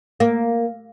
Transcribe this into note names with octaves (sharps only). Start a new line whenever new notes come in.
A#3